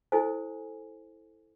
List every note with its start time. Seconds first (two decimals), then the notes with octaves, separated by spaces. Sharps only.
0.12 E4 A4 C5 G#5